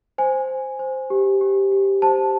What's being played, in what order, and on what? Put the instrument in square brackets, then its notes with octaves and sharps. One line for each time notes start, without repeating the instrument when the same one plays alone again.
[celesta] C5 G#5
C5
C5
G4
G4
G4
C5 A5